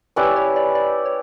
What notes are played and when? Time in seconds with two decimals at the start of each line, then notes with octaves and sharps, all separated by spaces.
0.16 C#4 E4 G4 B4 D5
0.36 C#5
0.56 D5
0.75 D5
1.06 C#5